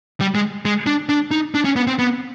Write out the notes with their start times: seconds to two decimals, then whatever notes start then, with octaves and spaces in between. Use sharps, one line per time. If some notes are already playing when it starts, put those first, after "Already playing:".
0.21 G3
0.35 G#3
0.65 G#3
0.86 D4
1.09 D4
1.31 D#4
1.55 D4
1.65 C#4
1.76 B3
1.87 C4
1.99 B3